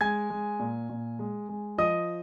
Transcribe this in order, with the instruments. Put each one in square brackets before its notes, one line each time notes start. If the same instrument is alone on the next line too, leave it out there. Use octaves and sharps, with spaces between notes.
[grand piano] G#3 G#5 G#6
G#3
A#2
A#2
G#3
G#3
F3 D#5 D#6